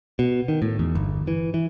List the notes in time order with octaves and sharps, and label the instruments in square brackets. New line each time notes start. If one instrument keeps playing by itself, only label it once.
[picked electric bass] B2
D#3
A2
E2
G1
E3
E3